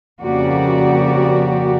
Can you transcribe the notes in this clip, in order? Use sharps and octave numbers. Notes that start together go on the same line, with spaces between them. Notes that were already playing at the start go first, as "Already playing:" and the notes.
F2 C#3 A#3 F#4 G4 D5